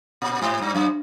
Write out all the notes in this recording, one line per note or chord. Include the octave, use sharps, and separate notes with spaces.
A#2
G#2
G2
F#2